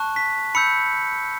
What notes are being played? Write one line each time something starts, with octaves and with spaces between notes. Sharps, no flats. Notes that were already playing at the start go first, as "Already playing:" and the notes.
Already playing: A5 C#6 F#6
B6
B5 E6 G6 C#7